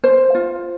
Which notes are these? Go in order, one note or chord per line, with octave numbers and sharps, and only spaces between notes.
C5
F4